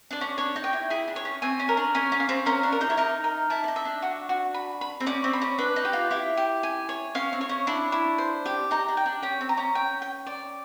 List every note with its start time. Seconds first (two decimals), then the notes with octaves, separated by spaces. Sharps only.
0.11 D4 D5
0.21 C#4
0.38 D4 C#5
0.56 D#4
0.64 G5
0.73 E4
0.90 E4 G#4
1.08 D4
1.16 C#5
1.25 C#4
1.42 C4 G#5
1.60 C#4
1.69 A#4
1.77 D4
1.95 C#4 G#5
2.12 C#4
2.20 F5
2.29 C4
2.46 C#4 A#4
2.63 D4
2.72 A#4
2.81 D#4
2.90 E4
2.97 D#4 A#4
3.24 A#4
3.50 E4 A5
3.64 D4
3.68 D#4
3.76 E5
3.85 D4
4.02 F#4
4.29 F#4
4.54 B5
4.81 B5
5.00 C4
5.06 C#4 D5
5.24 C4
5.33 B5
5.42 C#4
5.58 D4 B4
5.76 D#4
5.85 G4
5.93 F4
6.11 E4 G4
6.37 G4
6.63 G#5
6.89 C#5
7.15 C#4 F5
7.33 C4
7.41 C#5
7.49 C#4
7.67 D4 E4
7.92 E4
8.18 C5
8.46 G4
8.71 D#4 A#5
8.88 D4
8.97 G5
9.06 D4
9.22 C#4 G5
9.41 C4
9.49 A#5
9.57 C#4
9.75 G5
10.02 G5
10.27 D5